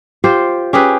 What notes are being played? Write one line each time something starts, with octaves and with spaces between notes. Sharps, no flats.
F4 G4 C5
C#4 G4 G#4 B4